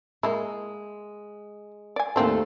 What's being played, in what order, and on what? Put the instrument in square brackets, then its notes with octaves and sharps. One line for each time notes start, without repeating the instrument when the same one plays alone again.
[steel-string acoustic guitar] G#3 [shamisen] A#3 E4
[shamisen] D5 G#5
[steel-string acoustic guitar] D#2 A3 A4 [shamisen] A#3 C4 D4